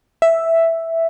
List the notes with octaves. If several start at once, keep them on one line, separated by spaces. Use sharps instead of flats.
E5